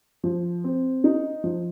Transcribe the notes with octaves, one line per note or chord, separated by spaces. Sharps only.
F3
C4
D#4
F3